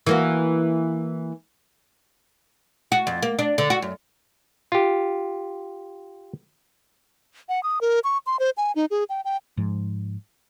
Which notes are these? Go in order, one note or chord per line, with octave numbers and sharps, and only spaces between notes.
E3 A#3 F#4
F#4
F2
A#3
D4
D3
F#4
F#2
F4 G4
F#5
D#6
A#4
C#6
C6
C5
G#5
D#4
G#4
G5
G5
G#2 F3